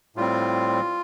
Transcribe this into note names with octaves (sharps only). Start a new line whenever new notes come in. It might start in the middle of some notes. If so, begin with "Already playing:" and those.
A2 G3 C4 F4